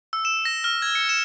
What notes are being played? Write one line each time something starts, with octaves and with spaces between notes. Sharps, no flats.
E6
E7
A#6
F6
G#6
C#7
E7